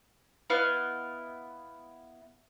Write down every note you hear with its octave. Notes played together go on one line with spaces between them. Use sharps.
B3 E4 D#5 F5